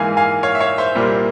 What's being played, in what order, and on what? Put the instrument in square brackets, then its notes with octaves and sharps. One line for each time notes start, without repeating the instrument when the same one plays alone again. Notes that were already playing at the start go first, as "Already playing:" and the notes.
Already playing: [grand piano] G#2 E3 A#3 F5 G#5
F5 G#5
C#5 F5
E5
C#5 F5
C5 E5
C2 A#2 G3 A#3